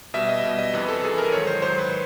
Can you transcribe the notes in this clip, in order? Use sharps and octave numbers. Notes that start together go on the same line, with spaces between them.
B2 G3 E5
D#5
B2 G3
D#5
F2 C3 E3 B4
A4
F2 C3 E3 G#4
A#4
G#2 D#3 F#3 C#5
C5
G#2 D#3 F#3 C5
B4